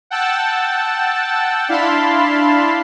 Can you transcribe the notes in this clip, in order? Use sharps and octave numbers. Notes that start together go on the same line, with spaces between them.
F#5 G5 A5 E6 F#6 A6
D4 E4 F5 A5 B5 C6